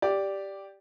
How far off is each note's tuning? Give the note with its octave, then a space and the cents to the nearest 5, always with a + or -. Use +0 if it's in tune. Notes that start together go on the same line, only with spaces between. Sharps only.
G4 +0 D5 -5